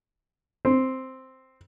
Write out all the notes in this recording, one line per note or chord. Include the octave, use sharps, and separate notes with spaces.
C4